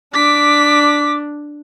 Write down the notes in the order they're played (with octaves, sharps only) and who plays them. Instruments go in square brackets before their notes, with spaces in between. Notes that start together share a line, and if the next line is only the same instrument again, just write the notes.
[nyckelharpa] D4 [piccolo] D6 [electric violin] B6